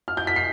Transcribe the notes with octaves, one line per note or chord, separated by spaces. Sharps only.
F6
G6
B6
C7